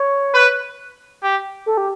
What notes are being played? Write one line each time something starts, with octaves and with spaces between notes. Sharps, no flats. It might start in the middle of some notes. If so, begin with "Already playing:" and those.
Already playing: C#5
B4
G4
A4
G4